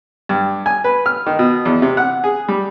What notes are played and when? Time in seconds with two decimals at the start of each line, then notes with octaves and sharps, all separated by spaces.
0.29 G2
0.66 G#5
0.84 B4
1.06 F6
1.26 D#3
1.39 B2
1.65 E2
1.82 C3
1.97 F#5
2.24 G#4
2.48 G3